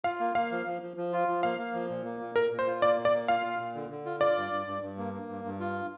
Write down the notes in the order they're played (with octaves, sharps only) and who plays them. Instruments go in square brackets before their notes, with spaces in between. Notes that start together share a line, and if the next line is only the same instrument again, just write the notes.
[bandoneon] F4 [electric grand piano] F5
[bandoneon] A#3
[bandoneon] A#3 [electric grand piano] F5
[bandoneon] F3
F3
F3
F3
F4
F3
[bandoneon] A#3 [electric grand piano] F5
[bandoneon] A#3
F3
A#2
A#3
A#2
[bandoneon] A#2 [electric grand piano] A#4
[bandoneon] A#2
[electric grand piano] C5
[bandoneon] F4
[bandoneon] A#3 [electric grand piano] D5
[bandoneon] A#2
[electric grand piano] D5
[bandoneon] A#3
[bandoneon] F4 [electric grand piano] F5
[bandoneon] A#2
A#2
D3
D3
F4
[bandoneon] F4 [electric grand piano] D5
[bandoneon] G2
G2
G2
G2
A#3
A#3
G2
G2
F4